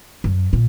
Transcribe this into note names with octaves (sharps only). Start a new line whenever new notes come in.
F#2
A#2